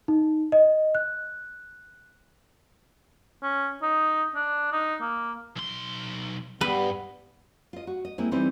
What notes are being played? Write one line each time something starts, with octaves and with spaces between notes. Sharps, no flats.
D#4
D#5
F#6
C#4
D#4
D4
D#4
A#3
B1 C6
G2 G3 B3 B4
F4 D#5
F#4
D#5
G#3 A#3 C4 E4
E3 G3 C4 D#4 E4